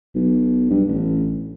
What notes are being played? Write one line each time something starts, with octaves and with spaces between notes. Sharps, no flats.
B1
G2
A1